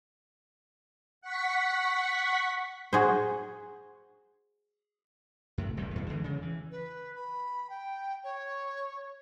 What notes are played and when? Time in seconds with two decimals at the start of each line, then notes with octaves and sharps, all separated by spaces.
1.21 F#5 C#6 B6
2.93 F#4 G#4 C5
5.58 F#2 A2 C3
5.77 E1 C2 C3 G3
5.95 E2 B2
6.09 E2 D3 E3 G#3
6.24 C#3
6.42 E3
6.71 B4
7.15 B5
7.69 G5
8.24 C#5